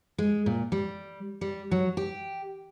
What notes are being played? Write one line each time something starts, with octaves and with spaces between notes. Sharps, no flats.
G#3
A#2
G3
G3
F#3
G4